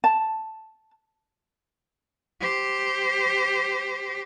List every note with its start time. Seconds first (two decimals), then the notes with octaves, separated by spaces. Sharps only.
0.04 A5
2.41 G4 C5